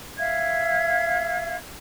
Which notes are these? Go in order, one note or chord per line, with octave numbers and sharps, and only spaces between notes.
E5 F5 G#6